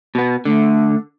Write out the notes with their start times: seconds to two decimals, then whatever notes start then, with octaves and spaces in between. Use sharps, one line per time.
0.15 B2 B3
0.45 D3 A3